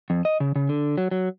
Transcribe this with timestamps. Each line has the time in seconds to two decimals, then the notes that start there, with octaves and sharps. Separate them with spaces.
0.10 F2
0.25 D#5
0.40 C#3
0.56 C#3
0.69 D3
0.98 F#3
1.11 F#3